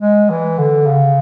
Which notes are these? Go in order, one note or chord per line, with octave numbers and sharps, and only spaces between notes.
G#3
E3
D3
C#3